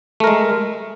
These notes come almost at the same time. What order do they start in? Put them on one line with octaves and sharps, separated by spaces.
A3 A#4 G#3